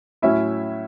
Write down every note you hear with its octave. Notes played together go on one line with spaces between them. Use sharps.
A2 F#3 C#4 E4 E5